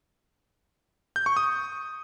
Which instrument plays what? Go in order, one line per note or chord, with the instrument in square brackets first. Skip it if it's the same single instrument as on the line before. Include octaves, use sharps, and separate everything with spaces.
[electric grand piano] G6
C#6
D#6